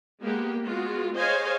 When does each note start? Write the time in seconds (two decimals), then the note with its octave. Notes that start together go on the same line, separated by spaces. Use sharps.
0.21 G#3 A#3 B3 G4
0.63 G#3 B3 F4 F#4
1.16 G#4 C5 C#5 D#5 F5 G#5